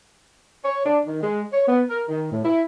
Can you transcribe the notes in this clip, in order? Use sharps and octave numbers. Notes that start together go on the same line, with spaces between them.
C#5
D4
D#3
G#3
C#5
B3
A#4
D#3
A2
E4